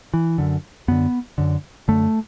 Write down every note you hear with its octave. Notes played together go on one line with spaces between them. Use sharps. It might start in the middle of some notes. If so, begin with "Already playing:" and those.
E3
F#2 D3
F#2 D3 B3
F#2 D3
F#2 D3 A3